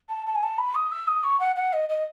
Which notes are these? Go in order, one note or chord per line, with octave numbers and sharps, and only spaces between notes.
A5
A5
G#5
A5
B5
D#6
E6
D#6
C#6
F#5
F#5
D#5
D#5